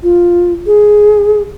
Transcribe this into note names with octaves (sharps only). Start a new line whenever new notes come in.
F4
G#4